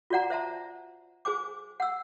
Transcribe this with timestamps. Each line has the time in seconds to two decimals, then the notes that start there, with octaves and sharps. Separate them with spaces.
0.10 F4 F#4 D5 F#5 A#5
0.30 C5 E5 A5 A#5
1.25 G#4 C5 G#5 D6
1.80 F#5 E6